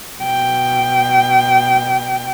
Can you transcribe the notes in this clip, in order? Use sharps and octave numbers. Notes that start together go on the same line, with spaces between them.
B2 G5